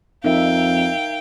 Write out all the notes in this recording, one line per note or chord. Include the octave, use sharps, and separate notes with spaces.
F2 D#4 A#4 E5 F5 G5